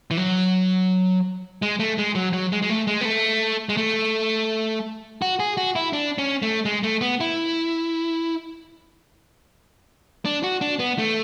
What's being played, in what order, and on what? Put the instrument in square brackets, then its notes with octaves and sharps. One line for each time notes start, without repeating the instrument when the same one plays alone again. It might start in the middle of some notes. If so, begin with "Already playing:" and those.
[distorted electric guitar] E3
F#3
G#3
A3
G#3
F#3
F#3
G#3
G#3
A3
G#3
B3
A3
G#3
A3
F#4
G#4
F#4
E4
D4
C#4
A3
G#3
A3
B3
E4
D4
F#4
D4
B3
A3